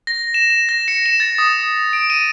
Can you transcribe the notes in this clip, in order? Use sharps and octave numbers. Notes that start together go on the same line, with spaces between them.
A#6
E7
E7
A#6
C#7
E7
A6
D#6
D7
D#7